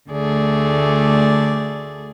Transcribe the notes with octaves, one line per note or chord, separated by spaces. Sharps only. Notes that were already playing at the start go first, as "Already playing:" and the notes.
D2 D3 A3 G#4 D5